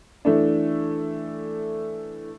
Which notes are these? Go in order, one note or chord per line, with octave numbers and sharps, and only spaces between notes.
E3 A3 D4